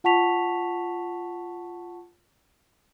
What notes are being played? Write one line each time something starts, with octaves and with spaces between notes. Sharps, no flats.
F4 F#5 A5 C#6 B6 F7